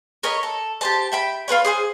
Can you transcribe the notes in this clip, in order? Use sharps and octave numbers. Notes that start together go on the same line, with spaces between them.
A#4 C#5 D#5 B5
A4
G4 C5 A5
E5 G5 B5
F4 F#4 B4 C#5
G#4 C5 G#5